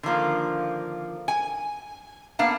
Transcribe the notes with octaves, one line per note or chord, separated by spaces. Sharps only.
D3 D#3 F3 A#3
G#5
A#3 B3 D4 F5 A5